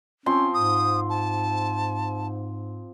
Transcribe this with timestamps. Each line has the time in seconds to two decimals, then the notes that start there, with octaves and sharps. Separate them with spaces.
0.26 F3 C4 C#4 C6
0.54 G#2 D#6
1.10 A5